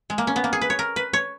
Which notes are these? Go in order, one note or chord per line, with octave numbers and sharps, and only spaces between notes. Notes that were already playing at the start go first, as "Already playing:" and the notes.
G#3
A#3
C#4
B3
A#3
G#4
B4
C#5
A#4
B4
C#5